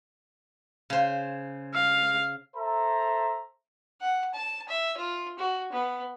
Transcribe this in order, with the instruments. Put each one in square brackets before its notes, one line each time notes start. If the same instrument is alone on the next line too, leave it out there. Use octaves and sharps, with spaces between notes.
[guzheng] C#3 C5
[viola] F5
[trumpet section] A4 C5 E5 A#5
[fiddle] F#5
A5
E5
F4
F#4
B3